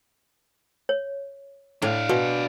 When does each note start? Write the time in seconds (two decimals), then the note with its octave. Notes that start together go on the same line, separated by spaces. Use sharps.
0.89 C#5
1.82 A2 D4 F5
2.09 B2 F#4